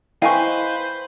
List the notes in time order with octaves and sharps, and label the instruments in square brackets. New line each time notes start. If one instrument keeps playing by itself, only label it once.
[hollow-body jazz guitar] E4 D#5 G5 [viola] B4 C5 [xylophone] F5 G#5 C#6